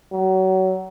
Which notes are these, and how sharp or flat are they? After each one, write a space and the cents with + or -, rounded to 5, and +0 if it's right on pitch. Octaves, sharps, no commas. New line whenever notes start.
F#3 +30